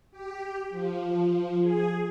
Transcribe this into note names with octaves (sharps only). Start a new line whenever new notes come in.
G4
F3
G#4